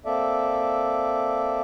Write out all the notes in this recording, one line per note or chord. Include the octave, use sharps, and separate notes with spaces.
A#3 C4 A4 D5 E5